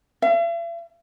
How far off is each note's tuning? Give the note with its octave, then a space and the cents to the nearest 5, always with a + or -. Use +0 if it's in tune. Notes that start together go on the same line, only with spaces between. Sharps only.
E5 +45